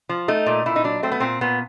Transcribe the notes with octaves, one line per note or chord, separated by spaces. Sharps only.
F3
A3 D#4
A#2
A#2 E4
D#4
F#3 D4
A3 C4
B3
A#2 C4
A#2 B3